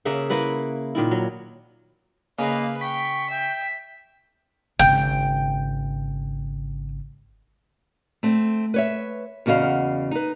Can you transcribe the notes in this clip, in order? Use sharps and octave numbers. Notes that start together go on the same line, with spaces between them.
C#3 A#3 E5 F#5
A#3 E4 B4 F#5
A#2 D#3 E4
F#3
C#3 A#3 B4 D#5 F5
G5 C#6 B6
E5 G5
G#1 C#3 G5
A3 C4
B4 C#5 E5
E2 C#3 F#4 D#5 F5
D#4 B4